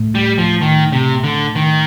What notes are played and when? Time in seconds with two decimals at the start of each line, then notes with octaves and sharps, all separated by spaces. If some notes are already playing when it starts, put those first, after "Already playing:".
Already playing: A2 A3
0.15 G3
0.38 F3
0.62 D#3
0.93 C3
1.24 D3
1.56 D#3